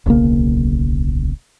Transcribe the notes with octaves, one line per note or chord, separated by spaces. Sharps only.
D1 B1 C#3 A#3